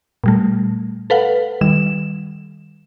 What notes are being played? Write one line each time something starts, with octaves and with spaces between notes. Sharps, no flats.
A#2 G3 A3
A4 B4 F5 F#5
D#3 G3 E7